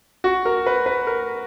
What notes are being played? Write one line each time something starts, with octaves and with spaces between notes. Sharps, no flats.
F#4
A#4
B4
B4
A#4